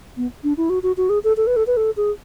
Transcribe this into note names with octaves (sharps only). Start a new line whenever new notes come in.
B3
D4
E4
F#4
F#4
F#4
G#4
A4
A4
B4
A4
B4
A4
G#4